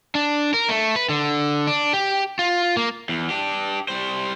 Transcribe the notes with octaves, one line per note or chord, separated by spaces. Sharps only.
D4
A#4
A3
B4
D3
D4
G4
F4
A#3
E2
D4 G4
G3 C5